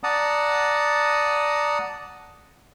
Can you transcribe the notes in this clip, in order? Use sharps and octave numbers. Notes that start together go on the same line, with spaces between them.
D5 F#5 A5 A#5 D#6